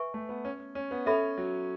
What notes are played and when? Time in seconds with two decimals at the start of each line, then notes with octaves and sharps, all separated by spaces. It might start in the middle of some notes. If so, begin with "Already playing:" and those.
Already playing: B4 E5 G#5 C#6
0.14 A3
0.29 B3
0.45 C#4
0.75 C#4
0.91 B3
1.06 C#4 A4 E5 B5
1.38 F#3